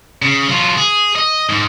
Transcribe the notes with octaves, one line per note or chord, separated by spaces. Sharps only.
C#3
F#3 F4
G#4
D#5
G#2